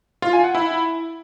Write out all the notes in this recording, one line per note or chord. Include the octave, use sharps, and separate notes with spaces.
F4
G#5
F#5
E4